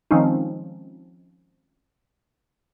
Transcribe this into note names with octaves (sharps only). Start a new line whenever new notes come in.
D#3 F3 G#3 C4 C#4 D#4